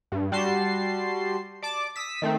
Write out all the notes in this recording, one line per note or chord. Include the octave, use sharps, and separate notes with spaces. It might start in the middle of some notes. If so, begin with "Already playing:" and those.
G2
G3 F#4 A5 C6 C7
D5 A5 D6
D#6 E6 B6
D#3 A3 C4